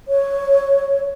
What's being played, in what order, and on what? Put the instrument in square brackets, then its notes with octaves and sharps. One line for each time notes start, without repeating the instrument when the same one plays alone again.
[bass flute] C#5